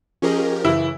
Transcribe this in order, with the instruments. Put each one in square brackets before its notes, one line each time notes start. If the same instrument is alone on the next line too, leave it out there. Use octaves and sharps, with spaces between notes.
[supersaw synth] F3 G4 A#4 [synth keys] C#4 G#4 D#5
[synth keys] F#2 C#3 E3 [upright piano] E4